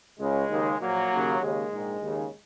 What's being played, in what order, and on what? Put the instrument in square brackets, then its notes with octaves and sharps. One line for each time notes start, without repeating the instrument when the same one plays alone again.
[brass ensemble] C#2 C#3 G#3
D#2 C#3
A#1 A#2 F#3 A#3
D#2 C#3
D#2 C#3 G#3
A#1 G#2 D#3
D#2 C#3